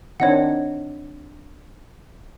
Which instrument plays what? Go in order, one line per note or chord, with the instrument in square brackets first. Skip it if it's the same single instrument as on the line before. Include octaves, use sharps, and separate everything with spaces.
[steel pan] D#3 C4 D4 [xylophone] C#5 D#5 F#5